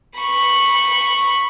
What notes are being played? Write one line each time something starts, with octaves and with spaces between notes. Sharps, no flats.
B5 C#6